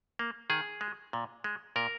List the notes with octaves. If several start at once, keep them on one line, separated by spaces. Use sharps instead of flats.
A#3
D#3 G#4
G#3
A#2
G#3
A#2 A#4